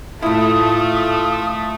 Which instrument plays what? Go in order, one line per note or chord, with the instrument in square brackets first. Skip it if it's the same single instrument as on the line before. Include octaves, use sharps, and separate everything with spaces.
[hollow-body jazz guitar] A2 E4 [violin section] A3 [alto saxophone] F4 [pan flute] D#6